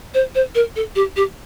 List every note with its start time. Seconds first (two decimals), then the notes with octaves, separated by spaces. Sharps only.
0.14 C5
0.35 C5
0.55 A#4
0.76 A4
0.96 G4
1.16 G4